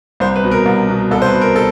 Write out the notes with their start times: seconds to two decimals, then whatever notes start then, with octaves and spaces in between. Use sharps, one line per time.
0.20 C2 C5
0.36 B4
0.44 B2
0.51 A#4
0.66 C2
0.89 B2
1.11 C2 A4
1.22 C5
1.26 B4
1.34 B2
1.41 A#4
1.56 A4